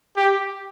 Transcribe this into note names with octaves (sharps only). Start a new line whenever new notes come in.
G4